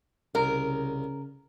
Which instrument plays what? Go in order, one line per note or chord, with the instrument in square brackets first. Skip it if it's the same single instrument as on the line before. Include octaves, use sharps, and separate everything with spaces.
[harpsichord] C2 [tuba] C#3 [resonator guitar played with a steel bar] A#4